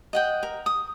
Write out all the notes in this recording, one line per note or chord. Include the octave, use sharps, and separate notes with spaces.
D#5 F#5 G5
A#4
D#6